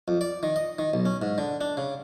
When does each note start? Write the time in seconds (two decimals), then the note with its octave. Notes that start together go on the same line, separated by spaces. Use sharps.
0.08 F2
0.21 D5
0.43 D#3
0.56 D#5
0.79 D#3
0.94 B1
1.05 C#4
1.22 G#2
1.38 D3
1.61 D4
1.77 C#3